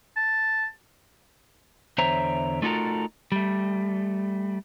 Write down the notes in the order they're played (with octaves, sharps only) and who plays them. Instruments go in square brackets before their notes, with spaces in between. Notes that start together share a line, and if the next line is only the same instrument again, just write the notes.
[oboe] A5
[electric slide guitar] E2 D3 C5 C#5 E5 A#5
A3 D#4 F4 F#4 A4 A#4
G3 A3